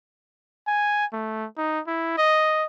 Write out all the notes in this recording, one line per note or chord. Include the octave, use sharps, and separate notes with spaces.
G#5
A3
D#4
E4
D#5